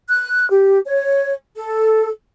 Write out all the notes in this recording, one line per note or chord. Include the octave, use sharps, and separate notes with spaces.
F#6
G4
C#5
A4